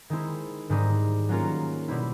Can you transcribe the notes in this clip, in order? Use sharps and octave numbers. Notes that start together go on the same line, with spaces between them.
D#3 G#3 C4 E4
G#2 D#3 G3 C4 D#4
F#3 A#3 C#4 F4 A#4
B2 G3 C4 E4